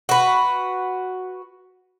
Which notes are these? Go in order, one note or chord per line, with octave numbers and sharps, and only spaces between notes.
F#4 B4